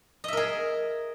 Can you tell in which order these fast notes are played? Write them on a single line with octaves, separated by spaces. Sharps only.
D#5 E5 A#4 G#4